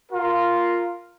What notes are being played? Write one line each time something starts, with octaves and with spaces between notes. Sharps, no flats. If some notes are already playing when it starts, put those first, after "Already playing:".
F4 A#4